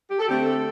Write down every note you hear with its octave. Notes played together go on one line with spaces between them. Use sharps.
G4
A4
D3 A3 C4 G4
A4